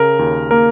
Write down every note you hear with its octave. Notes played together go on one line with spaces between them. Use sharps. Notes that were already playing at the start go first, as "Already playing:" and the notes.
Already playing: C#3 A#4
D#2
A#3 A#4